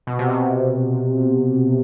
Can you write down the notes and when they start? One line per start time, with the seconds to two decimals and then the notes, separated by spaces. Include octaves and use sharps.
0.07 B2
0.19 C3
0.30 B2